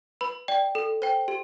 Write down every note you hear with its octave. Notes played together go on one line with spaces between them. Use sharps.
B4 B5
D5 G5
A4
C5 G5
G4